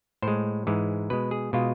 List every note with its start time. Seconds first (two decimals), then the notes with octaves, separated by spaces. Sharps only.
0.22 A2 C5
0.28 G#3
0.67 G#2 E3 G#3
1.10 B2 G#3 B4
1.31 G#4
1.53 B2 G#3 F4